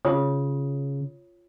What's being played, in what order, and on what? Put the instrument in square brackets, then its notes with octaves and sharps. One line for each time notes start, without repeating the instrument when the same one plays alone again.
[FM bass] C#3 [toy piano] F4 C#5 D#6